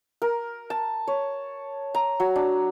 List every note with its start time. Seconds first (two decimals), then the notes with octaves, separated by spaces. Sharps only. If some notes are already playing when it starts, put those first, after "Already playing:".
0.22 A#4
0.70 A5
1.07 C#5
1.95 A#5
2.20 F#3
2.36 D4